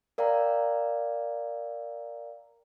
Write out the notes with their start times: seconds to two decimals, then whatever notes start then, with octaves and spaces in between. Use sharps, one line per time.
0.18 A#4 D5 F5 G5 A#5